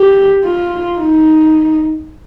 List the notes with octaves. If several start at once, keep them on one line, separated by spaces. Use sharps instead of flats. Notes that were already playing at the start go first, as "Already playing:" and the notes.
Already playing: G4
F4
D#4